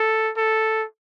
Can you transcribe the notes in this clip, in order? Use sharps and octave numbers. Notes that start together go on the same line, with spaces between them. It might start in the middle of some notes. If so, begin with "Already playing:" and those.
Already playing: A4
A4